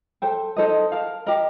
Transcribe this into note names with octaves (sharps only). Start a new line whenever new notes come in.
A4 C5 G5
D#4 A4 C5 D#5
A#4 F5 A5
G4 A#4 D#5